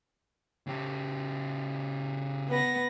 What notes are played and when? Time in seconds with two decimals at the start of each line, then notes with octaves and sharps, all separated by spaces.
0.67 C#3 G4
2.49 B3 B4 A#6